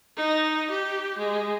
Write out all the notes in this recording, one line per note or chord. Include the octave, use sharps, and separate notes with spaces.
D#4
G4
G#3